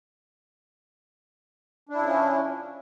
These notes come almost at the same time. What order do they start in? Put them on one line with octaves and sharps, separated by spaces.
D4 E4 C#3 F3 C#4